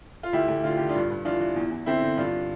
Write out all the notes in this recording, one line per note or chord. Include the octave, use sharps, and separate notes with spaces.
F4
D2 E4 G4
D2
D3 F4
D3 G4
D4 F4
G2
G2
E3 D4 F4
E3
E2
E2
D3 C4 E4
D3
G2 D4 F4